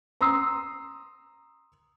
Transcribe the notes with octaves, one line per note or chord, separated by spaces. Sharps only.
A#5 C6 D#6 E6 C7